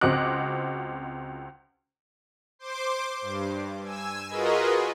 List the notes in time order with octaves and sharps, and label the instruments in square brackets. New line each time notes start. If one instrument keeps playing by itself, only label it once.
[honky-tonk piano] C#2 C4 F#4 D#5 D6 F#6
[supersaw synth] C5 C6 D6
G2
G#5 E6
F4 F#4 G#4 A#4 B4 D#5